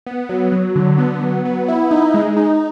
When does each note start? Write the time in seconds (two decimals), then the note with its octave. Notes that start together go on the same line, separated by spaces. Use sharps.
0.07 B3
0.29 F#3
0.52 F#3
0.76 D3
0.98 B3
1.22 F#3
1.45 B3
1.68 E4
1.91 D#4
2.14 G#3
2.37 D#4